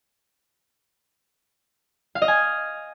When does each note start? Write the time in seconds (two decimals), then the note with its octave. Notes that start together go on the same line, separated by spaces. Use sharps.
2.15 F5
2.22 D#5
2.28 G#5